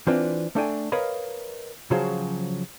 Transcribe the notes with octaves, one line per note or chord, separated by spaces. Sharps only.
E3 C4 D4 F4 B4
A3 D4 A4 D5 G5 G#5
A#4 B4 C#5 D#5 F5 B5
C#3 F3 F#3 F#4 G#4 C5